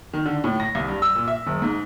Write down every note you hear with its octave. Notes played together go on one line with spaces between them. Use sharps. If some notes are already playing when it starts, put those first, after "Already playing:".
D#3
D3
A2
A#6
C2
G2
E6
A#2
E5
F#1
G#2